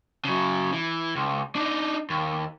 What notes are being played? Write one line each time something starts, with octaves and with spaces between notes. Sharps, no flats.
C#3 F#3
E3
C#2
D4 D#4
D#2